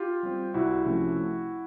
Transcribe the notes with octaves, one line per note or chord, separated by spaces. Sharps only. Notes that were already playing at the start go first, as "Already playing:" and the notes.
Already playing: F4 G4
G3 C4
C2 E4 F#4
C3 F3 A3 C#4